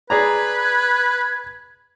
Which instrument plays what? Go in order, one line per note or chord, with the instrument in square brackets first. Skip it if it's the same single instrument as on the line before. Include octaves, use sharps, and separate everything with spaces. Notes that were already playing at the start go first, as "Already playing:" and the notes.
[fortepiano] G#4 D5 A#5 [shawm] B4 [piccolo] G#6